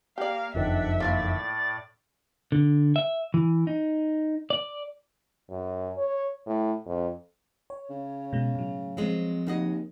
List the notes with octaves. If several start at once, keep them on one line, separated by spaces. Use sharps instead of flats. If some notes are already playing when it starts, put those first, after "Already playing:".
A#3 G4 D5 F5
F#1 F2 D#3 D4 E5 F#5
A2 A#3 F4 D5 F5 A6
D3
E5
E3
D#4
D5
F#2
C#5
A2
F2
C#5
C#3
B2 G#3
A2 F#3
F3 F#3 G#3 C4 F4
D#2 C#3 F#4 D#5